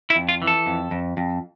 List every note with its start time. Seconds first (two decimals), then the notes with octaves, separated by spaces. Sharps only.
0.10 E4
0.16 F2
0.29 F4
0.42 E3
0.47 A4
0.66 F2
0.91 F2
1.17 F2